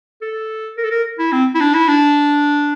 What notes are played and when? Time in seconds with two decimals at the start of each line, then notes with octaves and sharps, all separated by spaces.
0.22 A4
0.78 A#4
0.84 A4
0.91 A#4
1.19 E4
1.32 C4
1.55 E4
1.61 D4
1.74 E4
1.88 D4